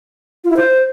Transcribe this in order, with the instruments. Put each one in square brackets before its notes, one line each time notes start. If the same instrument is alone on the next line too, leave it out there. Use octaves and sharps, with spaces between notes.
[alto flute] F4
E4
C5